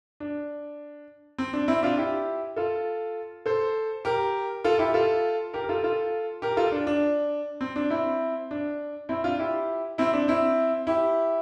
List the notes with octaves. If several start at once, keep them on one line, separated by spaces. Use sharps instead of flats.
D4
C4
D4
C4 E4
D4 F4
E4 G4
F4 A4
A4 C5
G4 A#4
F4 A4
E4 G4
F4 A4
G4 A#4
A#4
F4 A4
F4 A4
G4 A#4
F4 A4
D4
D4
C4
D4
C4 E4
D4
C4 E4
D4 F4
E4 G4
C4 E4
D4
C4 E4
E4 G4